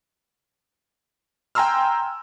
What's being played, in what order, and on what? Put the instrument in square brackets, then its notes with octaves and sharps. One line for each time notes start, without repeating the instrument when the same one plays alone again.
[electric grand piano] G5 G#5 A#5 C6 E6 F6